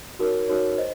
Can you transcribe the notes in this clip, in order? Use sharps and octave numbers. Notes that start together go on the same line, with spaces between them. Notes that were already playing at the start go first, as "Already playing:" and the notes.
D#4 F#4 A#4 C#5
D#4 F#4 A#4 C#5
C5 D#5